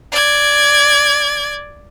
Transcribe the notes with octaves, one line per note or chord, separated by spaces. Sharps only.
D5 G#6